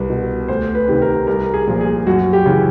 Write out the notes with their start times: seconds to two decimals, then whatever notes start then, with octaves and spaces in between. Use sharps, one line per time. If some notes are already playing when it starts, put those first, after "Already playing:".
Already playing: C2 B4
0.10 B2
0.48 D2 C5
0.75 B4
0.88 C3 D#3
1.02 A#4
1.27 C2 A#4
1.54 G#4
1.67 A#2 F3
1.81 G#4
2.07 F#2 F#4
2.33 G4
2.46 C#3 E3